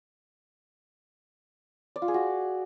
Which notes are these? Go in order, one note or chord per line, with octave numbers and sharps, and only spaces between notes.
D5
F4
G#4
F#4